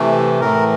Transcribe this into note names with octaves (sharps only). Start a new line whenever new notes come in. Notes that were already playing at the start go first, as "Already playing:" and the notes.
Already playing: C3 E3 A3
A2 E3 A3 A#4